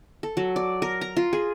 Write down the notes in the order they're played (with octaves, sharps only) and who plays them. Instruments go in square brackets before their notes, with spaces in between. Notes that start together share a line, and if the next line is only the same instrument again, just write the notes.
[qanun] A4
F#3
D5
A#4
A#5
F4
G#4